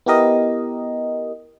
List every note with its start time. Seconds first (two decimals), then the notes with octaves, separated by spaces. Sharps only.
0.06 B3 E4 G4 A#4 D#5